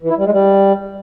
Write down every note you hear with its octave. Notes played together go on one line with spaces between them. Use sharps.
E3
E4
G3
G#3
G3